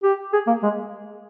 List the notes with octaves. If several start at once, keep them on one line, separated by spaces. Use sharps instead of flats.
G4
G#4
A#3
G#3